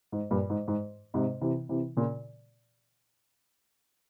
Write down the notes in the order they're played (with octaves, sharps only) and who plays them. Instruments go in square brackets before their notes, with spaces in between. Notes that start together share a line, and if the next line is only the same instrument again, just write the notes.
[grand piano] G#2
G2 A#2
G#2
G#2
G#2 C3
C3 E3
C3 E3
A#2 C#3